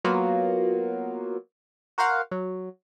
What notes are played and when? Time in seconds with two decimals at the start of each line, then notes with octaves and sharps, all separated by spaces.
0.04 F#3 A#3 B3 F4 F#4
1.98 F#4 A#4 C5 F5 F#5
2.31 F#3